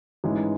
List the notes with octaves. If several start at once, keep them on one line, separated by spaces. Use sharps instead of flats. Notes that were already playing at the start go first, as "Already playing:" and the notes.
A1 G#2 E3 G#3